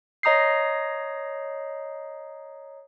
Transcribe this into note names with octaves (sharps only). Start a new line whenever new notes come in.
C#5 D#5 A#5 D#6 G6 C7